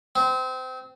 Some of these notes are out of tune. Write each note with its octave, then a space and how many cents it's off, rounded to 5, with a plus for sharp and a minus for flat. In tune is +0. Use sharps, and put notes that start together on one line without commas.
C4 -25